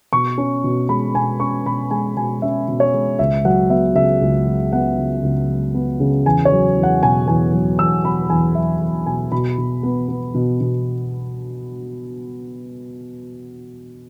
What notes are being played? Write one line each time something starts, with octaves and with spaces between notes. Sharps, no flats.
B2 C#6
C#4
B2
G#3 B5
B2 G#5
C#4 C#6
B2 B5
G#3 G#5
B2 G#5
C#4 E5
B2
C#5
G#3
C#2 E5
F#3 F#5
B3 E5
C#3 E5
C#2
F#3
B3 F#5
C#3
C#2
F#3
B3
C#3
E2 G#5
C#5
F#3
E2
F#5
B2 G#5
E2 G#5
F#3
E2 E6
B2 B5
E2 G#5
F#3 E5
E2
B2 G#5
B2 B5
B2
B3
B3
B2
B2